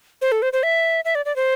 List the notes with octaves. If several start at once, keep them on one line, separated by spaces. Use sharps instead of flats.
C5
A4
C5
C5
E5
E5
D5
D5
C5